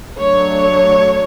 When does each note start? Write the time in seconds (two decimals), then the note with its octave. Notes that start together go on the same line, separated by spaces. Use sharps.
0.19 F#3 A3 D4 C#5